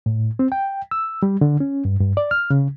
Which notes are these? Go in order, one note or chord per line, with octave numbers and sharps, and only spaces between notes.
A2
C4
G5
E6
G3
D3
C#4
G2
G2
D5
F6
C#3